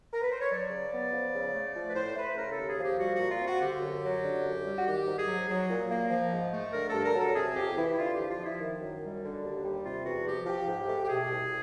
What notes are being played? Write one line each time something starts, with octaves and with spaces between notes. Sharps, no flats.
A#4
B4
C5
C#5
F#3 D5
C#3
B3
F3
C#3
A3
F3 D5
B4
A2 C5
A3 B4
C#3 A#4
A4
D#2
G#4
F3
G4
G3 F#4
F#4
A#2
F4
C4
F#4
D3 G4
F#2
F#3
D3
F#2
G3
F#4
D#3 G4
G#2
G#4
F#3
F#3
A#2
A#3
F3
G#2
A3
D3 A#4
G2 A4
A#4
F#3 A4
C3 G#4
F2 G4
E3 E4
E4
D3 F4
G4
F2
F4
F3
E4
D#3
F#2
G3
D3
D#2
G3
C3 F4
E2 F#4
F3 G4
F3 G4
G#2
A3
G4
B2 G#4
C2